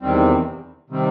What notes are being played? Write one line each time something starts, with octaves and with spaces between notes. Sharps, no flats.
E2 C3 D#3 G3 C4
C3 D#3 G3 C4